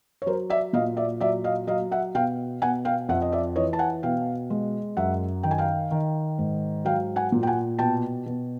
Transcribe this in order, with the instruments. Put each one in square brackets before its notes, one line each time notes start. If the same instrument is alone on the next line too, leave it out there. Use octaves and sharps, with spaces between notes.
[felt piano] C#5
F#3 A#4 C5
D5 E5
A#2 D#5 F5
D5 E5
F#3 D5 E5
D#5 F5
F#3 D#5 F5
E5 F#5
B2 F5 G5
B2 F#5 G#5
F5 G5
F2 E5 F#5
D#5
D5 E5
E3 C#5 D#5
A5
F#5 G#5
B2 F5 G5
G#3
F#2 E5 F#5
D#3 G5
G#5
F5 G5
D#3
G#2
F#3 F5 G5
F#5 G#5
A#2
G5
F#5 G#5
B2 G5 A5
B2